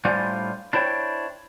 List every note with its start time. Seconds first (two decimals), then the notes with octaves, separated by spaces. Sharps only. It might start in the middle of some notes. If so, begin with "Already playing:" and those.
0.05 A2 G3 D4 F4 C5 G#5
0.73 D4 E4 C5 C#5 G5